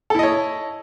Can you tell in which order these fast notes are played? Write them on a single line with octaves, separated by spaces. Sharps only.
A4 E4 D#5 C#5